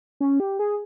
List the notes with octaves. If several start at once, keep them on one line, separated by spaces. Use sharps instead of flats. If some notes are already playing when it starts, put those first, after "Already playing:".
C#4
G4
G#4